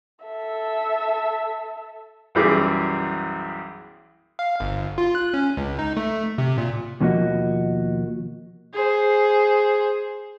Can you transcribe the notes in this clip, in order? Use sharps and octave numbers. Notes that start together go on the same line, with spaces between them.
A4 E5
B1 F#2 E3 G3 G#4 D6
F5
G1
F4
F#6
C#4
C#2
D#4
A3
C3
A#2
D#2 B2 F3 A#3 F#4 D#5
G#4 C5